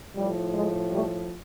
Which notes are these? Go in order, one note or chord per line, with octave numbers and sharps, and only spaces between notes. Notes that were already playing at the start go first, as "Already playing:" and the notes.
A2 F3 G3
G#3
G3 A3